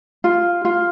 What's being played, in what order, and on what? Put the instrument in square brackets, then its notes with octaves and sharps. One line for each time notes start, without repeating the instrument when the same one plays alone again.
[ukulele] F4
F4